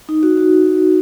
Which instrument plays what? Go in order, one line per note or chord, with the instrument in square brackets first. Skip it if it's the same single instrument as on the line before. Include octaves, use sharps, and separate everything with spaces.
[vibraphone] D#4
F#4
F#4